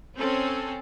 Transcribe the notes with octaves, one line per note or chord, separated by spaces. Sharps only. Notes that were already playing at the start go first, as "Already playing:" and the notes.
C4 C#4 A4